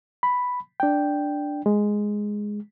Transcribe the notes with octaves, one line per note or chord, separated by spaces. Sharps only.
B5
D4 G5
G#3